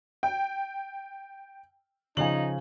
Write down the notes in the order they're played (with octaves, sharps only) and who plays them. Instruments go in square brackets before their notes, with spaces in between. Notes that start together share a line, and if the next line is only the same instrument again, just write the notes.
[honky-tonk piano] G5
[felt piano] C#3 F3 G#5 [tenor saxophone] D#4 [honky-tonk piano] F#7